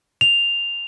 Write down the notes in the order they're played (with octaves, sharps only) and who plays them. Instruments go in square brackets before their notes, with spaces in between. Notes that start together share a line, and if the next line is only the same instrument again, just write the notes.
[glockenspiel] F7